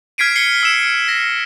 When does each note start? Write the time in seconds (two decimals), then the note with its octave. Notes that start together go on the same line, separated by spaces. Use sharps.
0.18 F6 G#6 B6 C7 D7 D#7
0.36 C7 C#7 G7
0.63 E6 E7
1.08 A#6